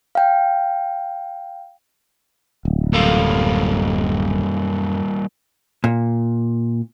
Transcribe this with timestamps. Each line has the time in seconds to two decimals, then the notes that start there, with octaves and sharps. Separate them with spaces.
0.15 F5 G5
2.65 D1
2.93 F#2 G3 A#3 A4 F5
5.84 A#2